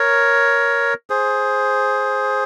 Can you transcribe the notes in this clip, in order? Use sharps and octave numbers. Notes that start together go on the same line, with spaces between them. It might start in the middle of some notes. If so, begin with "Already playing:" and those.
Already playing: A#4 C#5
G#4 C5